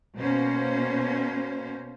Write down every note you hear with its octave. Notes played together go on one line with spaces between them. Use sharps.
B2 A#3 C#4 C5